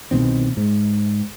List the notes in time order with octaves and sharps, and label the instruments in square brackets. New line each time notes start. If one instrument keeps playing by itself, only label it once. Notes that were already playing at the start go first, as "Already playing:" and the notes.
[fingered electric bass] C2 B2 D#3 C4
G#2